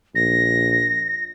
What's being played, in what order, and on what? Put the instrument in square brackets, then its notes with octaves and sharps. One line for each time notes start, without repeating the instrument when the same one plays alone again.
[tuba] A#1 [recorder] A#6